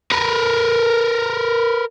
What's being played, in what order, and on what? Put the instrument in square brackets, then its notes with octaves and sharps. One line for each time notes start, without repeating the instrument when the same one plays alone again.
[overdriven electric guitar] A#4 B4